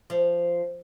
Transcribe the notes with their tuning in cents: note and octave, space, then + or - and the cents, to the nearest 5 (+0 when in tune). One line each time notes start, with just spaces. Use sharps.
F3 -10